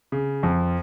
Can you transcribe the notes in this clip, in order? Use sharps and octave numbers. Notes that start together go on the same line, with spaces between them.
C#3
F2 F3